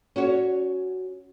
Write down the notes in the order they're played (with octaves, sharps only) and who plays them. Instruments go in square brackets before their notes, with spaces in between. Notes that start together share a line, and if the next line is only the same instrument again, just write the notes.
[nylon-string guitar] C#4 F#4 C#5